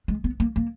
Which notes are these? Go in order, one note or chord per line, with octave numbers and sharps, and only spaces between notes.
G#3
B3
A#3
A#3